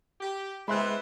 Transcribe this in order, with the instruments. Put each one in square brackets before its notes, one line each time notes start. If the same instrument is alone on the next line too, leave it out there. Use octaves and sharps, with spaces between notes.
[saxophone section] G4
[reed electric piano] G#3 [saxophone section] B3 C4 E4 [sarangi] E5 [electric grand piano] B5 C6 F#6